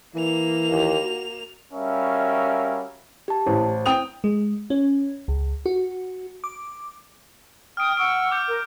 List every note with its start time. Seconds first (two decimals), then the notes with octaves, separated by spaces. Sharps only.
0.15 E3 A#3 F7
0.71 D#2
1.04 F#4
1.74 G3 C#4 F#4 A#4 E5 F5
3.28 G4 A5
3.46 A1 C5
3.86 G5 D#6 F7
4.24 G#3
4.70 C#4
5.28 C#2
5.66 F#4
6.44 D6
7.77 G5 D#6 F6 D7
7.97 F#5 C#6 E6 D7
8.31 D6 G6
8.47 A#4